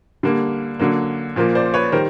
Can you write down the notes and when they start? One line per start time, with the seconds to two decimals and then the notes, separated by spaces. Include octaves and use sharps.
0.23 D3 G3 A#3
0.79 D3 F#3 A#3
1.36 A#2 F3 A#3
1.55 C5 D5
1.74 B4 C#5
1.92 D#3 G3 A#4 C5